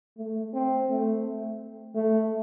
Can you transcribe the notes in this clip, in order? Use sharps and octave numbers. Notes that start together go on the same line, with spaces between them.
A3
C4
A3
A3